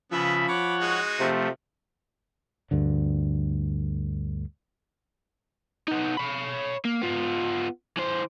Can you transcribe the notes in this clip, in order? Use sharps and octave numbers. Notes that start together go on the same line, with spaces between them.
C#3 F3 B3 E5 B5
C#5 F#5 B5 D6
G#3 D#4 F#4
C3 F3 A3
D2 G2 D3
B3 D#4
C#5 B5
A#3
B3 F4
E3 C5